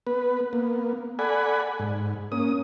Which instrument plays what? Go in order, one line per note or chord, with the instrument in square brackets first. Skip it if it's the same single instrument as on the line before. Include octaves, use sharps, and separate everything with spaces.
[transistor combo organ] B3 B4
A#3 B3
A4 D5 F#5 G#5 B5
G#2
A#3 C#4 D#6